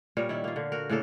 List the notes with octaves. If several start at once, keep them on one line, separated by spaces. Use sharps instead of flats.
A#2 G3 A#4 C#5
D#3 E4
A#3 F4
D3
F#4 A#4
A2 C#3 A#3 A4